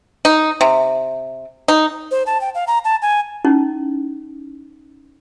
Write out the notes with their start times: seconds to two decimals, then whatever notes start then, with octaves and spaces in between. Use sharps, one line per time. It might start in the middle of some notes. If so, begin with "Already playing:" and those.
0.25 D#4
0.61 C3
1.68 D#4
2.11 C5
2.26 A5
2.41 G5
2.55 F5
2.67 A#5
2.85 A5
3.02 G#5
3.45 C#4 D#4 E4